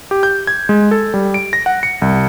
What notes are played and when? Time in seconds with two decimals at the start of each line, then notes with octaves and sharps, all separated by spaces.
0.11 G4
0.23 G6
0.47 G#6
0.69 G#3
0.91 A4
1.14 G3
1.34 D7
1.53 A#6
1.66 F#5
1.83 C#7
2.02 C2